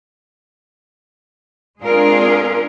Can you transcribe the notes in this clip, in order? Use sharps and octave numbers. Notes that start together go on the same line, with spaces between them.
G#3 C4 D4 F4 G#4 A#4